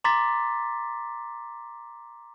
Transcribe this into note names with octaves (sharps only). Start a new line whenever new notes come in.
A#5 C6 D6 A6 B6